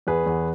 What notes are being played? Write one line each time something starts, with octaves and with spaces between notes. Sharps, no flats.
E2 G#4 B4
E2